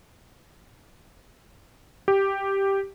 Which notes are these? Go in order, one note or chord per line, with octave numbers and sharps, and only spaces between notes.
G4